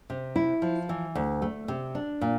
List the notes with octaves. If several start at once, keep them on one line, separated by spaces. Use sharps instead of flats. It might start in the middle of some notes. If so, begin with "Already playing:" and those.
C3
E4
F3
E3
D2
A3
C3
D4
A#2